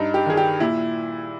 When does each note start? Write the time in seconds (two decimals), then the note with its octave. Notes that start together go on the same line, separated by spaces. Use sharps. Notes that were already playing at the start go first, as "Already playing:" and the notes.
Already playing: G2 D#4
0.14 G4
0.26 D#3 G#4
0.37 G4
0.60 A#2 E4